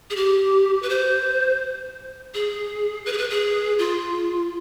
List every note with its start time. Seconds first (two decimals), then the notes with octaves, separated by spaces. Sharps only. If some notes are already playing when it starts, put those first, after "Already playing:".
0.10 G#4
0.16 G4
0.83 B4
0.90 C5
2.34 G#4
3.06 B4
3.13 G#4
3.18 B4
3.30 G#4
3.78 F4